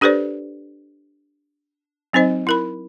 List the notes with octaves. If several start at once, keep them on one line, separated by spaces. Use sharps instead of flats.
D4 G4 A4 B4 C5 D5
F#3 C4 D#4 C5 D#5
E4 A#4 B5